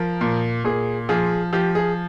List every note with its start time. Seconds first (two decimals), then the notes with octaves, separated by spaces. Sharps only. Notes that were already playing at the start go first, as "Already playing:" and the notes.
Already playing: F3 A#4
0.21 A#2
0.64 A#2 G#4
1.09 F3 G#4
1.53 F3 G4
1.75 G#4